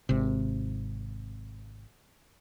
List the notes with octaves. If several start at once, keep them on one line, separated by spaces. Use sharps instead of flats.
G#1 C3